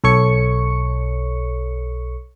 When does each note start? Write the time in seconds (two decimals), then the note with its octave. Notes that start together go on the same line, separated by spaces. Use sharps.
0.04 B1 A4 C#5 C#6 C#7